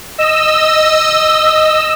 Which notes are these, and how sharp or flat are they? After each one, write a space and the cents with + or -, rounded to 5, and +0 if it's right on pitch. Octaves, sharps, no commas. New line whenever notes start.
D#5 +0 E6 +0